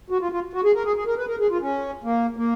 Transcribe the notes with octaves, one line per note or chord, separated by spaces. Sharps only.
F#4
F4
F4
F#4
G#4
A#4
G#4
G#4
A#4
B4
A#4
G#4
F4
C#4
A#3
A#3